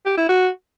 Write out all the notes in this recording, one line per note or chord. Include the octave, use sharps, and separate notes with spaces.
G4
E4
F#4